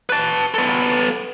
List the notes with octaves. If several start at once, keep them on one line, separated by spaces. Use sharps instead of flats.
B4 A5
B3 A4